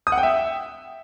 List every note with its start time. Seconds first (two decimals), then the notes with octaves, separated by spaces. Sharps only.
0.07 D#6
0.12 F#5
0.18 G5
0.23 E5